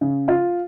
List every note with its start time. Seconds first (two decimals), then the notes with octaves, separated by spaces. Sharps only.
0.01 C#3
0.28 F4